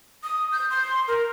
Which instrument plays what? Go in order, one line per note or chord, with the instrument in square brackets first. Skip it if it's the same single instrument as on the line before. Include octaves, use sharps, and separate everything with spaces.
[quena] D#6
G6
C6
A#4